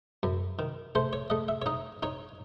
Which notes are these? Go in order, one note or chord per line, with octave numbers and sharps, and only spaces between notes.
F#2
D#3
A3 C5
C#5
A3 D#5
E5
C#5
D#4 D#5
D#4 C#5